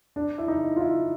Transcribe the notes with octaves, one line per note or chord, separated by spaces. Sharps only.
D4
E4
D#4
F4
E4